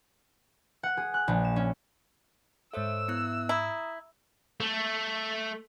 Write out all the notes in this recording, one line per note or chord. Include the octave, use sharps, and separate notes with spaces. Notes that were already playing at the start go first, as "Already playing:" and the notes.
F#5
G#4
F#6
A#1
E7
C#4
G#2 A4 C5 C#5 E5 E6
B3 E4 F#6
E4 A#5 D#6
A3